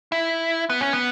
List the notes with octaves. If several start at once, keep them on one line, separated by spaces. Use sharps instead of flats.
E4
B3
C#4
B3